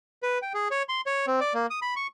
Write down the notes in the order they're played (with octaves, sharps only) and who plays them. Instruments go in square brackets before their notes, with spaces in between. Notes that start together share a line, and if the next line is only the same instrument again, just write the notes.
[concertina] B4
G5
G#4
C#5
C6
C#5
C4
D5
A#3
D#6
B5
C#6